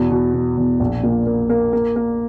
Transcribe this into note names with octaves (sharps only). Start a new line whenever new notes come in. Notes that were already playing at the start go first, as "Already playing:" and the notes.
Already playing: E2 B2
B2
B2
E2
A#1
A#2
A#3
A#3
A#3
A#3